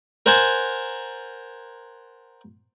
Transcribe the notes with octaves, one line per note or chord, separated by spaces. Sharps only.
A#4 C5 F#5 G#5 A5